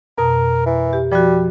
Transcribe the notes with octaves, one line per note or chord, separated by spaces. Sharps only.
F2 B2 A#4 A#5
E3
G4
F3 G3 F#4